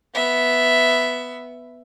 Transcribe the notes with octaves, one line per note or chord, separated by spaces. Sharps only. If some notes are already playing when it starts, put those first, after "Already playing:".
B3 E5